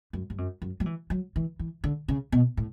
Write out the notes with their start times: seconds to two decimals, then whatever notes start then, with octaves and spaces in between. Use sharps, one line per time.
0.13 F#2
0.30 G2
0.38 F#2
0.62 F#2
0.80 F#3
0.86 E3
1.10 F#3
1.36 E3
1.59 E3
1.84 D3
2.08 C#3
2.32 B2
2.57 A2